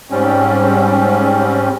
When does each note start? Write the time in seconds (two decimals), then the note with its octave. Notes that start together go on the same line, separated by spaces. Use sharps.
0.10 G#2 G3 C4 C#4